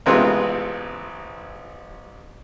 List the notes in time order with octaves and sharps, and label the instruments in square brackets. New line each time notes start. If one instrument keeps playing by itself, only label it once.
[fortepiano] A1 C3 G#3 B3 C4 F4